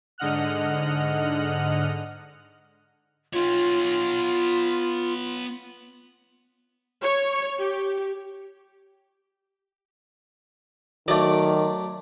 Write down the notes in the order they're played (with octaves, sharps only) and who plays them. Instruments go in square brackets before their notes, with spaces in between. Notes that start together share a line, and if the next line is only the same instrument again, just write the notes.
[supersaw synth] G#2 D3 D#5 F#5 F6 F#6
[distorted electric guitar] B3 C#5 [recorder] F4
[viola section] C#5
G4
[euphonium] D#3 [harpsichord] F#3 A3 [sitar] D5